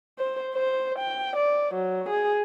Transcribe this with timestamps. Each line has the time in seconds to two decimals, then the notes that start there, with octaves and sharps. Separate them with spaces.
0.19 C5
0.54 C5
0.98 G5
1.36 D5
1.74 F#3
2.09 G#4